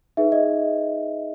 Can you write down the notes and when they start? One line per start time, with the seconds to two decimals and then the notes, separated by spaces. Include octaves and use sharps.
0.17 D#4 G#4 B4 E5
0.32 D#5